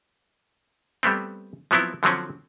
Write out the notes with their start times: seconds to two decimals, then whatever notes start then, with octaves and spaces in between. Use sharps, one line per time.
1.03 G3 A3 B3 C4
1.71 F3 F#3 B3 C4 E4
2.03 D3 F3 F#3 C4 C#4